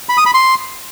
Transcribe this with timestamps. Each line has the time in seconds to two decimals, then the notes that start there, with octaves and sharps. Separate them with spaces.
0.09 B5
0.17 D#6
0.26 B5
0.34 C6